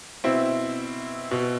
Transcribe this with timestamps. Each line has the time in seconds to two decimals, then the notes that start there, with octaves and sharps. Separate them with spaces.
0.24 B2 C4 E4
1.31 B2